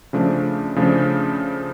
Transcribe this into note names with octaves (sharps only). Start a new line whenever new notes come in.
C#3 F3 A3 D4
C#3 F3 A3 D4